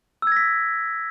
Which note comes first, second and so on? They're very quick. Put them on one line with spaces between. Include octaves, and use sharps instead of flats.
E6 G#6 A#6 B6